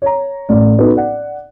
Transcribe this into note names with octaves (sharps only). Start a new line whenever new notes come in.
C#5 A#5
A1 A2 D5
B3 D#4 F#4 A4 B4
D5 F#5